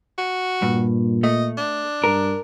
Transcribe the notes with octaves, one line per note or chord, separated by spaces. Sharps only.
F#4
G2 A#2
A3 D#5
D4
G2 A#4